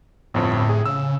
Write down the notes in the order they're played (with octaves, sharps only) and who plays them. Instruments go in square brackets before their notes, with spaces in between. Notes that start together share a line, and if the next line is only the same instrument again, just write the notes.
[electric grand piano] G1 F2 C4 [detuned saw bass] A2
[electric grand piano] G#4
[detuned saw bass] C#3 [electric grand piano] E6